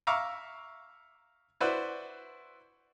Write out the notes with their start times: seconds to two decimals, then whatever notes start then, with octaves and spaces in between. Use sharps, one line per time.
0.07 E5 F5 A#5 C#6 D6
1.61 E4 F#4 B4 C5 D5